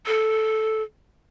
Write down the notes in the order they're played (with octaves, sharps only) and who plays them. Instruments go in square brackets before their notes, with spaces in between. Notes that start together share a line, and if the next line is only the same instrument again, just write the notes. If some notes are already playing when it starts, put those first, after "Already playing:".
[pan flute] A4